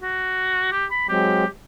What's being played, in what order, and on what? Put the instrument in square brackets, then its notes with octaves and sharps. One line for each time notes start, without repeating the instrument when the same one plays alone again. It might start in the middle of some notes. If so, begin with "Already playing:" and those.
[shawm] F#4
G4
B5
[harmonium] F#3 G#3 C4 [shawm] G4